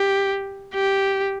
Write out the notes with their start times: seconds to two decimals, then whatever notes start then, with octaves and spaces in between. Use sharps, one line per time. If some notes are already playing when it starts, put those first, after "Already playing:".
Already playing: G4
0.75 G4